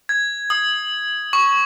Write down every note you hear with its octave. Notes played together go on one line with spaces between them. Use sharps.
G#6
D#6
C#6